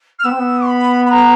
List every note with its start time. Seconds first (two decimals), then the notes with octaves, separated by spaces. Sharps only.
0.19 F6
0.24 B3 E6
0.31 C4
0.39 B3
0.67 B5
1.05 B5
1.10 A#5